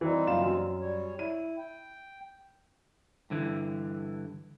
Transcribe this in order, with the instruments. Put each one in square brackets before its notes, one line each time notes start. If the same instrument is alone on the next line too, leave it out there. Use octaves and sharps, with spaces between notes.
[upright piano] E3 [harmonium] G3 C4 D#4
[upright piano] F#1 F4 E7
F#2
[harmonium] G3 C#5
[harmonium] E4 [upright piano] D#7
[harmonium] G5
[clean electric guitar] G2 D3 E3